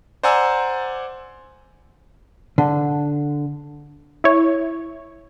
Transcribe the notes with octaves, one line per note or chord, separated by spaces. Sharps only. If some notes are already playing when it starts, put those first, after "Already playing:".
C5 D5 F#5 G#5 A#5 E6
D3
E4 C#5